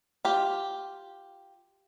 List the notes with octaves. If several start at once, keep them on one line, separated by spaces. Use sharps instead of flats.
F4 G4